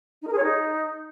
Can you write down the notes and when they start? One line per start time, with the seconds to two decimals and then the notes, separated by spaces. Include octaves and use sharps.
0.22 D#4
0.27 A#4
0.32 G#4
0.37 C#5
0.42 D#4